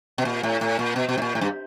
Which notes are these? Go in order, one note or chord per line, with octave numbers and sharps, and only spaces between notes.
B2
A#2
A2
A2
A#2
B2
B2
A2
A#2
A2
G2